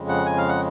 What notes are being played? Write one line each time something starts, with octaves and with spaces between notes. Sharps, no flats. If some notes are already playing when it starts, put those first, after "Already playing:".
Already playing: F2 C#3 G#3
F#5
G#5
F5
F#5